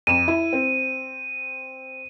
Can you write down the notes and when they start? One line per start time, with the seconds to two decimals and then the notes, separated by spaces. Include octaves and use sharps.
0.07 F2 D#7 E7
0.28 E4
0.53 C4